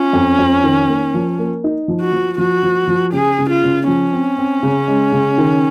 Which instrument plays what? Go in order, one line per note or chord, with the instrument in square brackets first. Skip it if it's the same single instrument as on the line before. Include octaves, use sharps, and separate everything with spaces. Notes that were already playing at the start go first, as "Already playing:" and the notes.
Already playing: [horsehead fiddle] C#4 [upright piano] F4
[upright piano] F2
F2
D#3
A#3
F3
A#3
D#4
F3
[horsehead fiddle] F#4
[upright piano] F3
[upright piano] F3 [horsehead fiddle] F#4
[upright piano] F3
F3
[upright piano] C#3 [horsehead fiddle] G#4
[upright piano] C#3
[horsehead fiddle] F4
[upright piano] C#3
[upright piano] F3 [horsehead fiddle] C#4
[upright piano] C4
C4
C#3
G#3
C#3
D#3